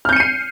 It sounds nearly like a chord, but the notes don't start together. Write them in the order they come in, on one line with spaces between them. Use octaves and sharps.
F6 G6 C#7 D#7 C7